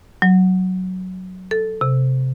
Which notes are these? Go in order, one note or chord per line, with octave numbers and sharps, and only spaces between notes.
F#3
A4
C3